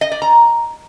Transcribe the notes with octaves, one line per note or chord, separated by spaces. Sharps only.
D#5
D5
A#5